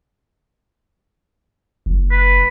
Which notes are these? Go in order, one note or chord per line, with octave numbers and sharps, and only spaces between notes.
F#1
B4